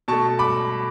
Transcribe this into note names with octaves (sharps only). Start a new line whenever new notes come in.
B2 A3 A5 C#6
B5 D6